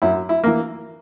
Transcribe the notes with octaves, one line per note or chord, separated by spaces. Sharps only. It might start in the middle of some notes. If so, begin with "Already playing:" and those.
F#2 E4
E4
E3 A#3